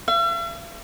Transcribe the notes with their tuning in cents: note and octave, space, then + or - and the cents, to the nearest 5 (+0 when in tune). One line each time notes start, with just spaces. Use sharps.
E5 +45